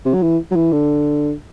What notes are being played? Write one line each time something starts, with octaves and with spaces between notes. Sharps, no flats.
C3
F#3
E3
F#3
E3
D3